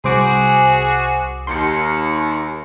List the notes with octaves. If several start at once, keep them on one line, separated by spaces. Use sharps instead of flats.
C2 F#4 G#4 C5 D6
D#2 C6 C#7